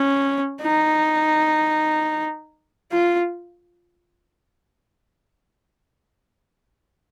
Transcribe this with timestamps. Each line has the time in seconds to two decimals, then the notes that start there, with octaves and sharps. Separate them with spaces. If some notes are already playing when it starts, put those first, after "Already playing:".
Already playing: C#4
0.63 D#4
2.91 F4